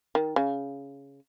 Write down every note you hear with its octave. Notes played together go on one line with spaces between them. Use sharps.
D#3
C#3